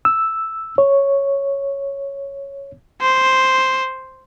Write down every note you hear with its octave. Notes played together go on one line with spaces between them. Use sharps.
E6
C#5
C5